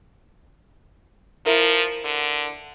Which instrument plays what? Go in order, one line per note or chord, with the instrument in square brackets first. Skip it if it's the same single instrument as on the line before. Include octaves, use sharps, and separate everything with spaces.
[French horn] F3 [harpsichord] E4 A#4
[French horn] D3